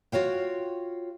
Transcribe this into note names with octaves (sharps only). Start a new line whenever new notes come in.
F4 F#4 C#5 F5 G5